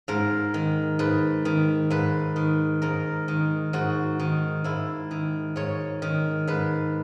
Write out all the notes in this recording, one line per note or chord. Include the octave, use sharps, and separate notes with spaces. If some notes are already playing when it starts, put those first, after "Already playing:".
G#2 A#4
D#3
G#2 B4
D#3
G#2 B4
D#3
G#2 A#4
D#3
G#2 F#4
D#3
G#2 E4
D#3
G#2 C#5
D#3
G#2 B4